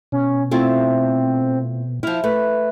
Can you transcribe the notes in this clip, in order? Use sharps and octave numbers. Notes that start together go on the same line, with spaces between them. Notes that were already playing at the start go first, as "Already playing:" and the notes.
B2 C#4
A3 C4 E4 F4
F3 E4 F6
A3 B4